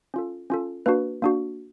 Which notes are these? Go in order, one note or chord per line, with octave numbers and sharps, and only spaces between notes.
C#4 F4 A4
C#4 F4 A4
A#3 D4 F#4 B4
A#3 D4 F#4